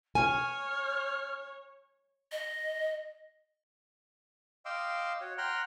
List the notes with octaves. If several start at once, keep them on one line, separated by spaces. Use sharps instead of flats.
C#5 G#5 F6
D#5
D#5 F5 G5 C6 D6 E6
F#4 C#5
F#5 G5 A#5 C6 F6 F#6